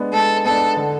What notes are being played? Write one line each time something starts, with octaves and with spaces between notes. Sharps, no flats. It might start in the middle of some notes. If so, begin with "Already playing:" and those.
Already playing: G#3 B3 D4
G#3 A4
B3 A4
D4
D3